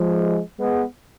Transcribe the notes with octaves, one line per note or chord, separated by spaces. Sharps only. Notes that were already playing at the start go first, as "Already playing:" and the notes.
Already playing: F3 G#3
G#3 B3